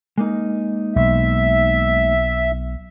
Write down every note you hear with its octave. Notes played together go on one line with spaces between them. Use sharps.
G#3 A#3 D#4
B1 E5